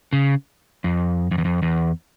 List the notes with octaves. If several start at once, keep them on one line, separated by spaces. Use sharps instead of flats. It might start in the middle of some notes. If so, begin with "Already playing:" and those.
C#3
F2
F2
E2
F2
E2